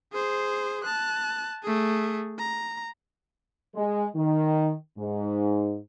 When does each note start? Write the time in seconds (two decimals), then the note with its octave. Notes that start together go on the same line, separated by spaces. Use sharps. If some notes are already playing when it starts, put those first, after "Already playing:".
0.13 G#4 C5
0.84 A5 F#6
1.63 A3 G#4
2.39 A#5
3.75 G#3
4.16 D#3
4.98 G#2